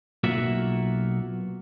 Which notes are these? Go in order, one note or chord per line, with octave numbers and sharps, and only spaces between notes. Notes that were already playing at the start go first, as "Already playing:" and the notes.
B1 A#3 F4 F#4 E5